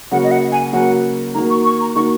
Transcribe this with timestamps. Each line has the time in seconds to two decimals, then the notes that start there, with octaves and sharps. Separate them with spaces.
0.11 C#3 F#3 A#3 F#4 F#5
0.23 D#5
0.31 F#5
0.52 G#5
0.73 C#3 F#3 A#3 F#4 F#5
1.34 D#3 A#3 F#4 A#5
1.50 C#6
1.65 C#6
1.81 A#5
1.95 D#3 A#3 F#4 C#6